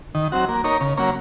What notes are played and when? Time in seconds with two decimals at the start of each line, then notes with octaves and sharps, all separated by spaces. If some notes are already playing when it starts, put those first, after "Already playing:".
0.15 D#3
0.32 F#3 C4 F#4
0.49 A#3
0.64 D#4 A#4 C#5
0.81 C#3
0.97 F#3 A#3 C#4